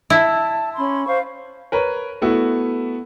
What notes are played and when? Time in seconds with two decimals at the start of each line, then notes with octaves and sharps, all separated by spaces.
0.10 E4 A5
0.75 C#4 B5 C6
1.07 C5 F5 C#6
1.72 A#4 B4 C#5
2.22 A3 B3 E4 F#4